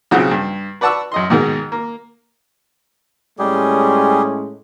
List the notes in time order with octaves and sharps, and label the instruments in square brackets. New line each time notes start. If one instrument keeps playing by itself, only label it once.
[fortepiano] B1 C#3 F3 C4 F#4 F#5
G2
B4 D5 F#5 A5 C#6 E6
F#2 D#5 C6
G#2 B2 D#3 G#3 A#4
A#3
[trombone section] A2 G#3 C#4 [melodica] G3 G4 G#4